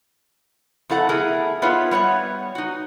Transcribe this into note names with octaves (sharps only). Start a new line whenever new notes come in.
F2 E4 A4 F#5 A#5
A3 B3 E4 G#4 A#4
B3 D#4 F4 B4 C#5 E5
G3 B3 C#5 F#5
D#4 F#4